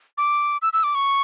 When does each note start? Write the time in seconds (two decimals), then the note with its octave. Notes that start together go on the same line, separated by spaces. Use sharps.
0.18 D6
0.62 E6
0.73 E6
0.84 D6
0.95 C#6